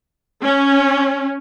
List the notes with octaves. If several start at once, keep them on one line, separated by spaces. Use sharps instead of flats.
C#4